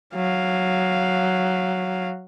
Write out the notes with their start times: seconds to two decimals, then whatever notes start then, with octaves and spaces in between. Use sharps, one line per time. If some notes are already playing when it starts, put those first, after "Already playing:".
0.15 F#3 F5